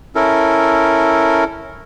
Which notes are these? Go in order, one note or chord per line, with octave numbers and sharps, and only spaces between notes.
C#4 E4 A4 A#4